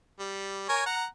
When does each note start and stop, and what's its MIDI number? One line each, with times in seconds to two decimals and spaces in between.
0.19 0.65 55
0.69 0.82 70
0.69 0.82 73
0.69 0.82 80
0.86 1.05 78
0.86 1.05 82